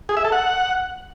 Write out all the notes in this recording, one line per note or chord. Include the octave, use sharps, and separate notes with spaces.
G#4
E5
A4
F#5